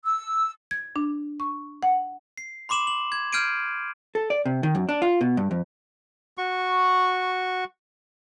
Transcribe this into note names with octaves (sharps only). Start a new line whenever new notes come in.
E6
G#6
D4
C#6
F#5
C7
B5 C6 D6 E7 F#7
F#7
G#6
F6 G6 G#6 C7 D7 D#7
A4
D5
C3
D#3
F#2
D4
F4
B2
G2
F2
F#4 C#6